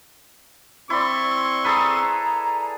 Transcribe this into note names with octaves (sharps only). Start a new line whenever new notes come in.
C4 E4 D5 C6 C#6
G#4 A4 B4 A#5